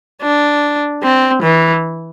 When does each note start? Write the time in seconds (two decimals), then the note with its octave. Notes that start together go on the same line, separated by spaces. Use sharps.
0.22 D4
1.03 C4
1.43 E3